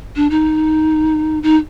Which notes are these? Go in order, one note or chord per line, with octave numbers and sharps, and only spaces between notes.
D4
D#4
D#4